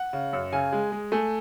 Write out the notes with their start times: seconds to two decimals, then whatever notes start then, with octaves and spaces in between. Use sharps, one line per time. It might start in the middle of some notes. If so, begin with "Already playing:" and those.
Already playing: F#5
0.13 C#3
0.33 F#2
0.52 C#3 G#5
0.72 G#3
0.92 G#3
1.12 A3 G#5